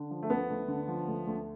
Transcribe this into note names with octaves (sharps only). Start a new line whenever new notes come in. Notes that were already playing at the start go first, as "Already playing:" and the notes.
Already playing: D3
F3
A3
D2 B3
D2
D3
F3
D2
D2